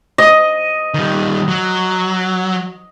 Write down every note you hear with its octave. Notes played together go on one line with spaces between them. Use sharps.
D#5
D#3 G3
F#3